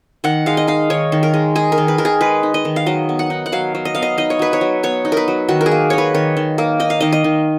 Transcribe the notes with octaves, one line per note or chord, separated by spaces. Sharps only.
D#3 F#5
G#3 F5
D#5
D#4 F5
D#3 C#5
D#3
A#4
G#3
D#4 G#4
A#4
D#3
B4
D#3 A#4
G#4
G#3 B4
D#4
D#5
D#3
F5
F#3 D#5
B3
F#5
D#4
F#5
F#3 F5
F#3
D#5
B3 F5
D#5
D#4 D#5
C#5
F#3 B4
C#5
F#3
B3 C#5
D#4
A#4 B4
F#3
D#3 F#4
A#4
G#4
A#3
D#4 C#5
B4
D#3 C#5
D#3
A#3
D#4 D#5
F5
D#3 D#5
D#5
D#3